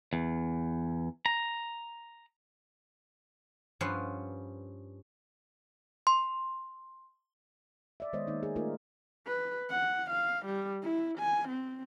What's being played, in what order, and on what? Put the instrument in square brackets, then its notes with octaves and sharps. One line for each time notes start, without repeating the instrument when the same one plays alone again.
[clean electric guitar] E2
A#5
[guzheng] G2 F3 C#4 B4 F#5 C6
[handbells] C6
[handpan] D5 E5
D#3 G#3 B3 C5 C#5 D#5
D#3 A#3 D#4
G#4
A3 A#3 D#4 F4 A#4
[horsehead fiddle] B4
F#5
F5
G3
E4
G#5
C4